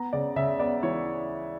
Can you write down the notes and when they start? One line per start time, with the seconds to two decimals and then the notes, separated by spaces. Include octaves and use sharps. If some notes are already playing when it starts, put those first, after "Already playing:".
Already playing: B3 A#5
0.13 C#3 D5
0.36 C#3 E5
0.59 B3 D5
0.83 E3 C#5